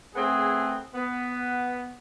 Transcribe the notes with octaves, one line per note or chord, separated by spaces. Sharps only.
A3 B3 C4 G#4
B3